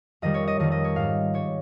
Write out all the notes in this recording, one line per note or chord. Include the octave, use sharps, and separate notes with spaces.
F2 D#3 G3 D#5
C#5
D#5
F2 D#3 G3 D#5
D#5
C#5
G#2 G3 F5
G3 C#5